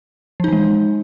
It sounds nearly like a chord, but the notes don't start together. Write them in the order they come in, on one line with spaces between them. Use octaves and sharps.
F3 D#4 E3 G#3